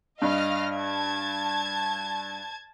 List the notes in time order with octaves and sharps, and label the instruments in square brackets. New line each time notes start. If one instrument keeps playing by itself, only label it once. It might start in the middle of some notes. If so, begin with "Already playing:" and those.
[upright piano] G2 [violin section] D#5 F5 F6
[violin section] A5 G#6